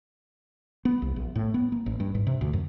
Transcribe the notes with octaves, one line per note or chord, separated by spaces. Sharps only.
B3
C2
A#1
A2
B3
A#3
A1
G2
G#2
C3
D2
F#2